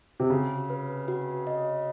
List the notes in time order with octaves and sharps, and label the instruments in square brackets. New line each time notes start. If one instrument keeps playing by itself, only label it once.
[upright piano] C3
[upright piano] C#3 [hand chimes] F#4
[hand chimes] B4
F#4
D#5